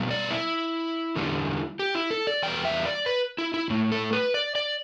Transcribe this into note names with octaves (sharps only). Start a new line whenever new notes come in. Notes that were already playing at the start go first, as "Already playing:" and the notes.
Already playing: B2 G3 B3
D5
E4
E2 D3 G3
G4
E4
A4
D5
E2 E3 G3 B3 G5
E5
D5
B4
E4
E4
A2 A3
A4
B4
D5
D5